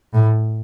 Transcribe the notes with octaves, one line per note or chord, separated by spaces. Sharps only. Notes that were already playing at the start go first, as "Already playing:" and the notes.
A2